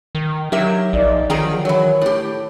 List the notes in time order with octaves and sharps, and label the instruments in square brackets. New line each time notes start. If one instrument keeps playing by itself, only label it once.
[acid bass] D#3
[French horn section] D#3 [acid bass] F#3 [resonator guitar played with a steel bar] G4 A#4 E5
[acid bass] A#1 [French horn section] D#4 D5 D#5
[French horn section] D3 F3 F#3 [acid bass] D#3 [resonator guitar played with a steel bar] G#4 G5 A#5
[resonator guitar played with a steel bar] E3 F#3 [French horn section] C#5
[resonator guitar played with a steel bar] A2 G4